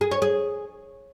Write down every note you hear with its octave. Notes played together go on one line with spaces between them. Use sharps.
G#4
C#5
G#4